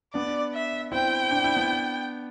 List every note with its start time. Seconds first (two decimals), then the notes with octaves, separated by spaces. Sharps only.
0.14 B3 D4 D5
0.54 E5
0.92 C4 E4 G5
1.31 D4
1.44 E4
1.57 B3 D4